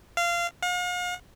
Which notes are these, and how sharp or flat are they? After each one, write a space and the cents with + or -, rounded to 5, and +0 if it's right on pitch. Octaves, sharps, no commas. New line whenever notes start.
F5 -20
F5 +45